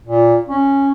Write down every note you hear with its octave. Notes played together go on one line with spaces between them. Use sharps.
A#2
C#4